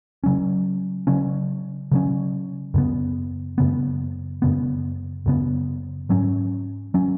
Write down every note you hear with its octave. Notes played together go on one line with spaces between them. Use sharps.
C#3 F#3 C#4
C#3 F#3 C#4
C#3 F#3 C#4
F#2 C#3 B3
F#2 C#3 B3
F#2 C#3 B3
F#2 C#3 B3
G#2 F#3 C#4
F#3 C#4